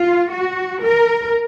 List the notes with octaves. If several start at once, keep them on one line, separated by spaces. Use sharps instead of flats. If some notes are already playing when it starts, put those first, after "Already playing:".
Already playing: F4
F#4
A#4